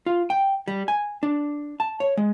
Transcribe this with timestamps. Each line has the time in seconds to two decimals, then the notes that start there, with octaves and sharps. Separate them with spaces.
0.06 F4
0.30 G5
0.68 G3
0.88 G#5
1.23 D4
1.80 A5
2.00 C#5
2.17 G#3